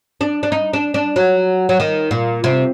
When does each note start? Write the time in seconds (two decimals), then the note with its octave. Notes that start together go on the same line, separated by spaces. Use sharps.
0.21 D4
0.43 D4
0.52 D#4
0.73 D4
0.94 D4
1.16 F#3
1.69 F#3
1.80 D#3
2.11 A#2
2.44 C3